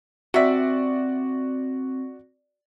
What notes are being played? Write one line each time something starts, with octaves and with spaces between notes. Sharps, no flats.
C3 C4 F#4 D5 E5